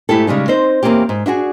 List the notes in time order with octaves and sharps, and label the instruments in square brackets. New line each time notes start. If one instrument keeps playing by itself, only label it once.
[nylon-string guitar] G#2 A3 E4 G4 A4
C#3 G3 G#3 D#4
C4 D#4 C5
E2 A#3 C4 C#4 G4
G#2
D4 E4 F#4 G#4